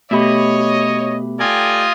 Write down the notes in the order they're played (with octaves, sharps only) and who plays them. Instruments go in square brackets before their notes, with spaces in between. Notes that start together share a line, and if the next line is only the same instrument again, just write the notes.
[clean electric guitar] B2 [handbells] A3 G4 B5 [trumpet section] C#5 D#5
[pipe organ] F4 D#5 G#5 [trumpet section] A4 D5 G5